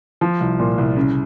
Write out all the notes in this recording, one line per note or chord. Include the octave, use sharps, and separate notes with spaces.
F3
C2
A#2
C2
C#3